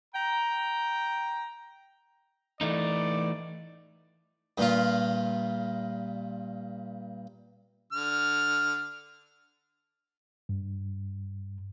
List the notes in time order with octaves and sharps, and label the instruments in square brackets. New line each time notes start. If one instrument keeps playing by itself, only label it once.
[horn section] G5 A#5
[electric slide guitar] E3 A3 D#4 [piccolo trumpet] D5
[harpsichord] G2 A#2 F4
[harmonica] D3 F6
[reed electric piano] G2